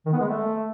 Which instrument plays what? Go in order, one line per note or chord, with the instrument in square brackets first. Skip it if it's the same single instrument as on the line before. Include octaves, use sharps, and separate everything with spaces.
[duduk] D#3
B3
G#3
A3